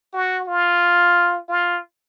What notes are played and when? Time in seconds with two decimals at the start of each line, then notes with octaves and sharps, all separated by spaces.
0.13 F#4
0.47 F4
1.49 F4